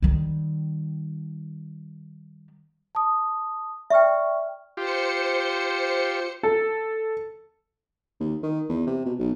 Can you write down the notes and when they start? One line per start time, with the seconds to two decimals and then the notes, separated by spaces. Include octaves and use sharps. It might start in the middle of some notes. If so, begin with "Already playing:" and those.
0.02 D#3 G3
2.95 A5 D#6
3.90 D5 E5 G5 C#6 F6
4.77 F4 G4 C5 C#7
6.43 A4
8.20 D#2
8.42 D#3
8.69 E2
8.87 C3
9.05 B2
9.19 B1